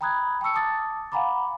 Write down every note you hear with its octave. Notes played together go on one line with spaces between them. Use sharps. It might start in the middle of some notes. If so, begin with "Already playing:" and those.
G5 A#5 B5 D#6 F#6 G#6
G5 A5 C#6 E6 C#7
A5 D6 D#6 A6
F5 F#5 G#5 A#5 B5 D6